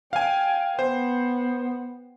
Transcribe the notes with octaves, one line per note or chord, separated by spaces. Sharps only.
F5 G5 G#5
B3 C5